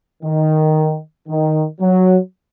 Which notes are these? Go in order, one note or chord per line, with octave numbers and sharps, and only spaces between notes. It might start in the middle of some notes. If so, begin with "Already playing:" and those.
D#3
D#3
F#3